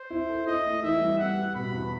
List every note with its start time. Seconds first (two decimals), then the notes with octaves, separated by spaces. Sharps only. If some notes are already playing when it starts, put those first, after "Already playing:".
Already playing: C5
0.10 E4
0.29 A4
0.47 E4 D#5
0.64 A3
0.83 E3 E5
1.01 G3
1.19 B3 F#5
1.37 G3
1.55 B2 B5
1.72 E2